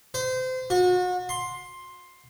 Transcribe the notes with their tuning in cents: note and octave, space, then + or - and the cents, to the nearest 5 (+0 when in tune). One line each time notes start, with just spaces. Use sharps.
C5 -30
F#4 -35
C6 +10